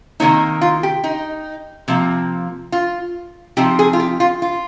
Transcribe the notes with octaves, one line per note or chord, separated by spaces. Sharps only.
C3 D#3 A#3 D#4 C#5
F4
G4
D#4
C3 F3 A#3
F4
C3 F3 C4 D#4 G4
G#4
F4
G4
F4
F4